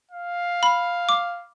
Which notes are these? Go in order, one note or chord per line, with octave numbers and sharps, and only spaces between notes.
F5
B5
D6